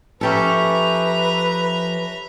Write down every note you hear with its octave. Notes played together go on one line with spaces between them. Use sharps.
F3 C#4 G4 A4 B4 E5 A#5